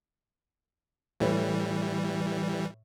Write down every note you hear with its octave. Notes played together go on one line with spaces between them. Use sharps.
A2 E3 G3 B4 C#5